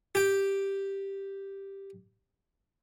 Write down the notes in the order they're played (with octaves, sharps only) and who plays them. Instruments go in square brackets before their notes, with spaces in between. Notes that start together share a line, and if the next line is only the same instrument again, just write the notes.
[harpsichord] G4 G5